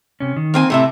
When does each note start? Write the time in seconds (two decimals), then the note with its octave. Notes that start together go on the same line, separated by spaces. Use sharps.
0.20 C3 C#4
0.36 D#3
0.54 A#3 C4 G#5
0.70 A2 C3 A4 E5